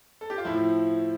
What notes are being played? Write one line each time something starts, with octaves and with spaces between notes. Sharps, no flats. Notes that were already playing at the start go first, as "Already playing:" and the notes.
A4
G4
F4
A2 F3 E4